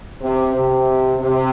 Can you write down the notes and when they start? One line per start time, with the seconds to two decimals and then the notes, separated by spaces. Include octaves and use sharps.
0.22 C3
0.54 C3
1.19 C3